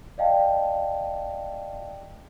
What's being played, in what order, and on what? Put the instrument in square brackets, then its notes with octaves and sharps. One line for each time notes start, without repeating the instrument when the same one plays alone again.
[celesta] D5 D#5 F5 G5 A5